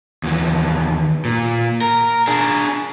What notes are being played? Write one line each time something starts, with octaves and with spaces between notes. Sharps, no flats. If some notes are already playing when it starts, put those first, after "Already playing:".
D#2 E3
A#2
A#4
D4 G#4